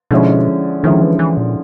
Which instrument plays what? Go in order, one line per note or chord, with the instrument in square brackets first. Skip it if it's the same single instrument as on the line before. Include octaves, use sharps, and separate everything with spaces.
[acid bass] B2 [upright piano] D3 F3 G#3 C#4 E4
[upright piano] D3 F3 G#3 C#4 E4 [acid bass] D#3
[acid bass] E3
E3
A#2